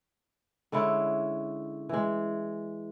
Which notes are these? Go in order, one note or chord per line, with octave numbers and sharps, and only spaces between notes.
D3 G#3 C#4 E4
E3 G#3